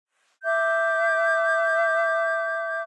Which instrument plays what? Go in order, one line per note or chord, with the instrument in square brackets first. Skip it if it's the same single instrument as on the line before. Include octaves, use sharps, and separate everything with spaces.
[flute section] E5 D6 G6